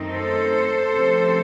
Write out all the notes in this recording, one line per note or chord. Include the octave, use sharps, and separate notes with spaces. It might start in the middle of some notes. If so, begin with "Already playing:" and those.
Already playing: F#2 D#3 A3 C4 D#4
A4 C5
C3 F3 A3 C#4